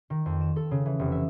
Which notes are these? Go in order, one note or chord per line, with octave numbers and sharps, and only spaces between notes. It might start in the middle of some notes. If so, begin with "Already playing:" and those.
D#3
F2
E7
A4
C#3
E3
F1
E5